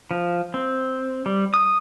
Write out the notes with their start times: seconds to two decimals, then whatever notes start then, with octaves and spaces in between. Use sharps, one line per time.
0.11 F3
0.54 C4
1.26 G3
1.54 D#6